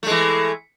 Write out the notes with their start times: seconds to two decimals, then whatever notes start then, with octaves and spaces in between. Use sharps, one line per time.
0.03 A3
0.06 G#3
0.10 E3